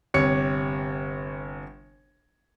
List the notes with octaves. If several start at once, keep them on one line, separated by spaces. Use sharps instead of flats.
G1 C3 C#5 C#7